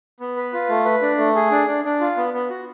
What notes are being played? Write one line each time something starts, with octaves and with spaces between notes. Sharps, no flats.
B3
B4
F4
A3
B4
D4
A3
G#4
D4
D4
D4
F4
B3
B3
F#4